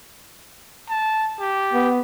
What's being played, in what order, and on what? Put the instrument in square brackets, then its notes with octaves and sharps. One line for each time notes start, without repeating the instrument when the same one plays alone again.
[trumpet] A5
G4
[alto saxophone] B3